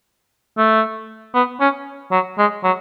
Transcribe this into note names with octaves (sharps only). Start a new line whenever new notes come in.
A3
B3
C#4
F#3
G#3
F#3